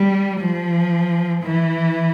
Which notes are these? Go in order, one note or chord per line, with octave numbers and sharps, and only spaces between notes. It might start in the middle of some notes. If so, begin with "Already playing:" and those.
Already playing: G3
F3
E3